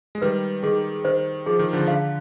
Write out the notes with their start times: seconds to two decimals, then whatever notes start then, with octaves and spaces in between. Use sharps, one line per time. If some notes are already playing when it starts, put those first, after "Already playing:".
0.15 G#3
0.22 D#3 G3 B4
0.63 D#3 G#4
1.05 D#3 C5
1.46 F3 G#4
1.59 D#3
1.73 D3 F3
1.88 D3 F5